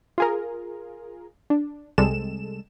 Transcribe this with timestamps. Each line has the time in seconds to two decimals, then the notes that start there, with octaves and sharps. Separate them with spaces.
0.18 F4 G#4 A#4
1.50 D4
1.98 C2 C3 G3 G#3 A4 E7